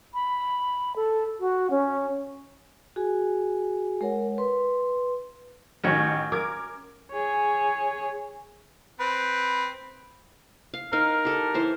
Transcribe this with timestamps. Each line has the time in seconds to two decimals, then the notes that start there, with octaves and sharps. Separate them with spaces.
0.14 B5
0.96 A4
1.40 F#4
1.70 C#4
2.96 F#4 G#4 G#5
4.01 G#3 A#4 C#5 F#5
4.38 B4 C6
5.84 A1 D#3 C#4 F#4 C#5 C#6
6.32 A#4 D6 G#6
7.12 G#4 C#5
9.00 C4 B4
10.74 F5
10.93 D#4 A#4 D#5 F5
11.25 G4 A4
11.54 E3 C5 C#5